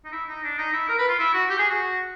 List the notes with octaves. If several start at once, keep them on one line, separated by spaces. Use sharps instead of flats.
D#4
E4
D#4
D4
D#4
E4
A#4
B4
F4
E4
F#4
G4
G#4
F#4